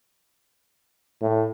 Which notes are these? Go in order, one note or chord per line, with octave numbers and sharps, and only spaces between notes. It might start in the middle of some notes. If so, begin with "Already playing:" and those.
A2